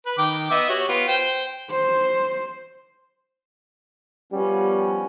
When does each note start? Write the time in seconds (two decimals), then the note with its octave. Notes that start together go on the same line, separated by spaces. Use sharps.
0.06 B4
0.18 D#3 G5 D6
0.51 B3 D#5 E5
0.69 F#4 G4 C#5
0.89 B3 F4
1.08 C5 G5
1.71 C5
4.32 F3 G3 B3 C#4